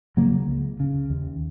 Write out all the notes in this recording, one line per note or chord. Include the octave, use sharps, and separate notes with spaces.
C#3 F#3 A#3
C#2
C#3
D#2